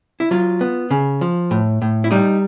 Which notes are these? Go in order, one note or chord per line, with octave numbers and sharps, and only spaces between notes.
E4
F#3 F4
B3
C#3
F3
A2
A2
E4
G3 D#4